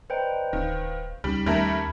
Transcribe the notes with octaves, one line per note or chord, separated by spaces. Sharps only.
B4 C5 D5 D#5 G5 A#5
D1 D#3 F5
C#2 G3 C#4 D#4
D#2 G3 A3 A#4 A5 B5 G#6